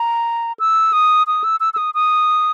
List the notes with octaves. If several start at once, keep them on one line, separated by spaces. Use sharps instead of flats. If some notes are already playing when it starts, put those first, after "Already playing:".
Already playing: A#5
E6
D#6
D#6
E6
E6
E6
D#6
D#6